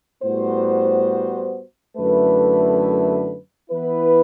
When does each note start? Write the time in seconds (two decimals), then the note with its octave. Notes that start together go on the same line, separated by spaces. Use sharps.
0.23 A2 G3 B3 F#4 C5
1.97 F#2 D3 A3 E4 B4
3.71 E3 B3 E4 B4